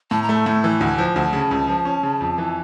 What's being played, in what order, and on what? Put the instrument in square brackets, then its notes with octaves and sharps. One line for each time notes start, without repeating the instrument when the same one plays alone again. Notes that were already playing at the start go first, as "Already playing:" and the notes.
[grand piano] A2 [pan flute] A5
[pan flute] A#5
[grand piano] A3
[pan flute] A5
[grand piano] A2
E3
D2
F3
D2
C#3
C#2
F3
C#4
C#3
F2
E3